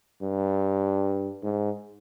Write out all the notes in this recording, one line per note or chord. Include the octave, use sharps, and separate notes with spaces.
G2
G#2